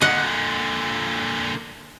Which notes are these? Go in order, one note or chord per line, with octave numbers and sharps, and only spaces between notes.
A#2 D3 D#5 F#5